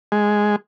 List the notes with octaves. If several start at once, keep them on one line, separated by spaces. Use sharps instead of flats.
G#3